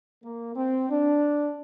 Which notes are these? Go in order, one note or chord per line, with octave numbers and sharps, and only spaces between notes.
A#3
C4
D4